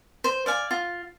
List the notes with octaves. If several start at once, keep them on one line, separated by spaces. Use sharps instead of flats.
C5
D5 F5 G#5
F4